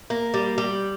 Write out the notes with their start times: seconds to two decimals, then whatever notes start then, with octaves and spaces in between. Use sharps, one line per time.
0.10 A#3
0.34 G3
0.58 G3